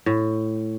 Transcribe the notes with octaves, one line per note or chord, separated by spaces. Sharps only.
A2